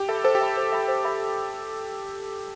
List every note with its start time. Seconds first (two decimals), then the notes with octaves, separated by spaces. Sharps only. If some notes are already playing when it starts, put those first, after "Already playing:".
Already playing: G4
0.09 A4 E5 B5
0.24 A4 C5
0.35 G4
0.41 E5 B5
0.57 C5
0.72 E5 B5
0.88 C5
1.05 E5 B5